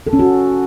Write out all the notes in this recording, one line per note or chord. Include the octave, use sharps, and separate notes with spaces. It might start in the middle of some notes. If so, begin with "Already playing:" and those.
A4
C#4
F#4